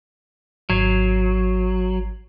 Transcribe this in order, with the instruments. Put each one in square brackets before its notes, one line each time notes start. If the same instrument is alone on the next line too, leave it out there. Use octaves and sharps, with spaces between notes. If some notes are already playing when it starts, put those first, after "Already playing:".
[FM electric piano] G#1 G#6 C7 [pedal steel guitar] F#3